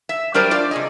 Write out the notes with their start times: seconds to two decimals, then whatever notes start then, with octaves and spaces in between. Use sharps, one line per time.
0.09 E5
0.34 F#3 G3 D4 A#4 C5 D5
0.51 F4 D5
0.71 C3 G#4 D#5